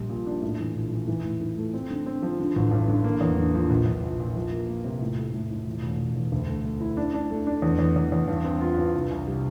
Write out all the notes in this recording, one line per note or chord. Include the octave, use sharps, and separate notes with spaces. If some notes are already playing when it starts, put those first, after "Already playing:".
Already playing: A#1 F3 G3
A#2
D4
A2
E3
A#1
E3
E3
A2
E3
A3
C4
D3
C4
F3
D3
A1
G2
D3
A#3
E2
D3
F3
A#1
A#1
A#1
A#2
F3
A#3
A#3
C3
A2
A3
A2
A2
E1
E1
E1
E2
D2
A3
A3
E4
D4
D4
A3
D4
E2
E2
E2
E2
G2
C4
F4
G2
C2
C2
G3